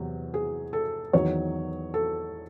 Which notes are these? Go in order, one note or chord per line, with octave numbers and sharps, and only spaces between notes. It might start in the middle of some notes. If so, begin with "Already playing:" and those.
Already playing: E2 C3 F#3
G#4
A4
E2 D#3 F#3 C#5
A4